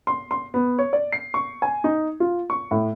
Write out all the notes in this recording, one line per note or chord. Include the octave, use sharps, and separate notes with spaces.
C6
C6
B3
C#5
D5
C7
C#6
G#5
D#4
F4
C#6
A2